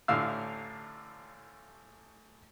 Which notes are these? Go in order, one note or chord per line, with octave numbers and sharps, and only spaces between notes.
A1 A2 D3 A3 F5 E6